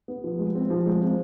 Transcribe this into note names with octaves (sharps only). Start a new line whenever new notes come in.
B3
F3
G#3
C4
F3
G#3
C4